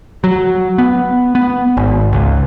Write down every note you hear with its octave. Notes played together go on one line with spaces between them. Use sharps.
F#3
B3
B3
G#1
C#2